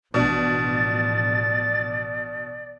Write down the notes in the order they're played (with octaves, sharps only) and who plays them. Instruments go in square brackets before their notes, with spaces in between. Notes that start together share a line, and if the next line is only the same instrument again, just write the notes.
[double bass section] A1 F3 [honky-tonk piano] B2 D4 [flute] D5 [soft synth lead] A6